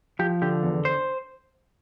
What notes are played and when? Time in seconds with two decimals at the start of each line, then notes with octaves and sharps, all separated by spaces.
0.19 F3 G4
0.42 D3 G4
0.63 E2
0.85 C5